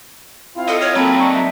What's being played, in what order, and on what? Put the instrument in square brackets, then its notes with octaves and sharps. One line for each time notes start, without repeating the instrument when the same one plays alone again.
[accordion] C4 E4 F4 [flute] F5
[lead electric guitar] B2 D#5 [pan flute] A4
[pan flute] C#5 [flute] F6
[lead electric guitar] B1 F#3 [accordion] A#3 A4 [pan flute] C4 [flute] B5
[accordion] A#3 D4 D#4 [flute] C#6
[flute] E5